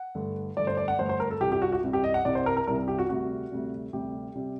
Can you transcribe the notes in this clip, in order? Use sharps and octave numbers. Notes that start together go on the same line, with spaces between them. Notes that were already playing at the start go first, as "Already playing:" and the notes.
Already playing: F#5
G2 D3 A3
G2 D3 A3 D5
C5
D5
F#5
G2 D3 A3 C5
C5
A#4
A4
C2 C3 G3 G4
G4
F#4
F#4
C2 C3 G3
G4
D#5
F#5
C2 C3 G3 D5
C5
A#4
A#4
C2 C3 G3 A#4
G4
F#4
D2 C3 G3 F#4
D2 C3 G3
D2 C3 G3 G4
C3 G3